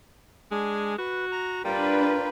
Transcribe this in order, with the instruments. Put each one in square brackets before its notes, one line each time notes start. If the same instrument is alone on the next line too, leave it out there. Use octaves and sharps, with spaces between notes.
[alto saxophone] G#3 [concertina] D4 G#5
[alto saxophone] F#4 [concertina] B4
[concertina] A#5
[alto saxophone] G3 [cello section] D4 B4 [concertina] F4 A#4 G5